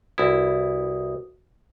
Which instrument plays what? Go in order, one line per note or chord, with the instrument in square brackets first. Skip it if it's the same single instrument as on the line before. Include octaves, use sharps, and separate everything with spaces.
[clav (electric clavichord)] C2 E4 [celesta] F#4 B4 D#6